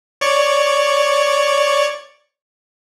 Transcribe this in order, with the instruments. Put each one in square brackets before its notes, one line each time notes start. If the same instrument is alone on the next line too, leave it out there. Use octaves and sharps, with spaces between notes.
[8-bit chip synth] C#5 D5 C#6